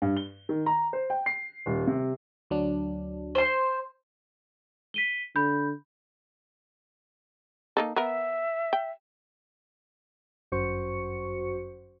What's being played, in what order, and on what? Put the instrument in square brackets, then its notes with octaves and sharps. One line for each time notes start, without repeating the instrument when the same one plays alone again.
[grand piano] G2
G7
D#3
A#5
C5
G5
C7
D#1
C3
[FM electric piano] D2 F#3 D4
[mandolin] C5 C6
[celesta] B6 D#7 G7
[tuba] D3 [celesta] B5 G6
[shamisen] A#3 D#4 A4
[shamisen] B3 A#4 [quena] E5
[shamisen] G5
[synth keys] G1 F#2 F#4 C5 C#6 C#7